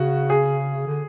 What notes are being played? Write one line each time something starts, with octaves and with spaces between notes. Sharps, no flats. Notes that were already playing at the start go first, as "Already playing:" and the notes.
Already playing: C#3 F#4
G#4
D3